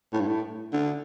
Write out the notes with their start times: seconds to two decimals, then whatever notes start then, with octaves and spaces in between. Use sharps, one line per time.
0.13 A2
0.20 G2
0.28 A2
0.73 D3